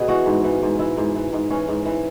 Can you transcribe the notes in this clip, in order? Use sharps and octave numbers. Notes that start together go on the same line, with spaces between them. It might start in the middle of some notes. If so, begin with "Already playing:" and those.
Already playing: B2 B3 G#4
E3 F#4
G#2
E3
G#2
E3 E4
G#2
E3
G#2
E3 C#4
G#2
E3